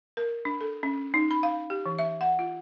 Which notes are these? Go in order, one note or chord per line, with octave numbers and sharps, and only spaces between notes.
A#4
D4
A4
C#4
D#4
B5
F5
G4
E3
E5
F#5
F4